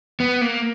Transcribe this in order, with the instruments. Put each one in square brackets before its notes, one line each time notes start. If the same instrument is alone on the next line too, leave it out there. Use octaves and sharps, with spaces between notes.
[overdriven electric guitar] B3
A#3